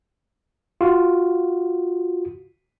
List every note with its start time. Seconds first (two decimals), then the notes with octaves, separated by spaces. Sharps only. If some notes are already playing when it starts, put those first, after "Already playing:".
0.81 F4 F#4